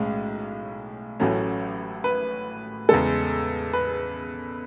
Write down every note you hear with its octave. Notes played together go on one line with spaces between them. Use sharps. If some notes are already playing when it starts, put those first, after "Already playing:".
Already playing: B1 A2 G#3 C#4
A1 A2 F#3 A3 C#4
B4
E2 C#3 G#3 A4
B4